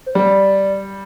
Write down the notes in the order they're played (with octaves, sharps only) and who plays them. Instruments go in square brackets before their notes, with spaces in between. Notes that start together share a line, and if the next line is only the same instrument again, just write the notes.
[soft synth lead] C5
[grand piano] G3 [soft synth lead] D5